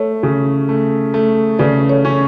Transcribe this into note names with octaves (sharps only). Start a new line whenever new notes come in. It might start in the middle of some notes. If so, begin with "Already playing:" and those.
Already playing: A3 A4 C#5
C#3
A3
A3
C#3 B4 D5
A4 C#5
C#4